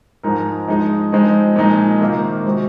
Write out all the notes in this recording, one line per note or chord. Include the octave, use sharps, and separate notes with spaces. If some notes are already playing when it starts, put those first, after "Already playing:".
G#2 F3 G#3 D#4 A#4
F3 G#3 D#4 G#4
F3 G#3 C4 D#4
A#2 F3 G#3 D#4
C3 D#3 A#3 F4
G#3 C4 F#4